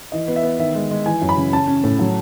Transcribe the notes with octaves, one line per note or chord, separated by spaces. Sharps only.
E3 D#5
B3
E5
B3
D#3 E5
G#3
G#3
E3 G#5
F#2
B5
C#3
C#4 A5
C#4
A2
F#3